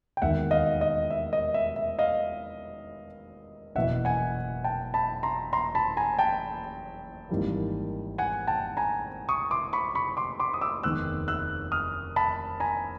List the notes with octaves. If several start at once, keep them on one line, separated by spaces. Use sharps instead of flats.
G5
E1 D#2 D#3 E5 F#5
D#5 F5
D#5
E5
D#5
E5
E5
D#5 F5
F#1 E2 B2 E5 F#5
F#5 G#5
G5 A5
A5 B5
A#5 C6
A#5 C6
A5 B5
G#5 A#5
G5 A5
G#1 G#2 E3 G3 A#3
F#5 G#5
G5 A5
G#5 A#5
C#6 D#6
C6 D6
B5 C#6
B5 C#6
C6 D6
C6 D6
D#6
D6 E6
F1 D#2 D#3 G#3 B3 E6 F#6
E6 F#6
D#6 F6
A5 B5
G#5 A#5